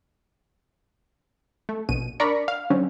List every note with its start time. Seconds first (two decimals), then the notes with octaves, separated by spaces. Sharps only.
1.69 A3
1.89 A#1 B2 D#7
2.20 D4 A#4 D5 A#5 B5 C#6
2.48 F5
2.70 D3 F#3 C4 C#4